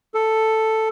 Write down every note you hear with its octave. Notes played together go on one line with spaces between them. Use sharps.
A4